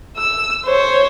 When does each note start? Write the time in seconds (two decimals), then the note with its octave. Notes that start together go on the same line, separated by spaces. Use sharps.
0.17 E6
0.65 C5 C#5